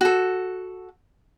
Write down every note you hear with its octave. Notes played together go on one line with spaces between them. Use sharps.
F#4 A4